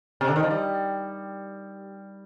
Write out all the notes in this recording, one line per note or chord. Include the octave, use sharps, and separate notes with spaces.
C3
D3
D#3
F3
G3